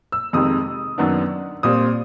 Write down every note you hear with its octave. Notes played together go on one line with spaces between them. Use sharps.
E6
F2 C3 D#3 G#3 D#6
F#2 D#3 F#3 B3 D4
A#2 G3 C4 D#6